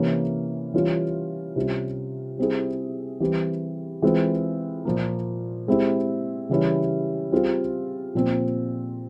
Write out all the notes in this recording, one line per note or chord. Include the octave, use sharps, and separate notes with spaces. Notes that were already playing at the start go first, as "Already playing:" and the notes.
Already playing: C3 E3 A#3 C#4
E3 G3 C#4 F4
C3 G3 C#4 F4
G3 C4 E4 G#4
E3 G3 C4 G4
E3 G#3 C4 F4
A#2 F3 A#3
G#3 C4 E4 G4
C#3 E3 G3 C#4 E4
G3 C4 F4 G#4
A#2 F3 C4